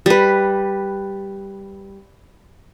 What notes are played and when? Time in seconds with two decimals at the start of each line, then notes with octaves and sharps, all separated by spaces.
0.06 G3 B4